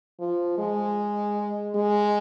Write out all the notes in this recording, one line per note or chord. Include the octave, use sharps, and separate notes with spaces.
F3
G#3
G#3